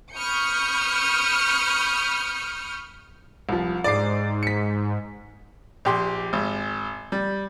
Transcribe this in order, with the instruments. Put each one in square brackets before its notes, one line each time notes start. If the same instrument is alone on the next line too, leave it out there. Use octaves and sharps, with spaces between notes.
[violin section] B5 C#6 D#6 F6 G6 C#7
[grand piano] C2 F3
[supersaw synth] G#2 [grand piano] D5 D6 C7
[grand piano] B6 C#7
[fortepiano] A#1 G4 C6
G#1
G3